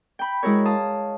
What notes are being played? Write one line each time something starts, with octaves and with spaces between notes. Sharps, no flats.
G5 B5
G#3 E4 F#4 A#4 C#5
F5 A5 D#6